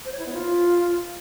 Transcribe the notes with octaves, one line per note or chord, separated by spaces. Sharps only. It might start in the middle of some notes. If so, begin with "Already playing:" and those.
C5
C#5
E4
B3
F4